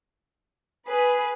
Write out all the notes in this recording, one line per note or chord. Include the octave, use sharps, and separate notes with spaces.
G#4 B4